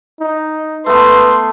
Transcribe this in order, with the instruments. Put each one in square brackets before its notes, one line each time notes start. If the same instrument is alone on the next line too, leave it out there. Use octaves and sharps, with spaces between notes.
[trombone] D#4
[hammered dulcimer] A3 B3 [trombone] B4 [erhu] C6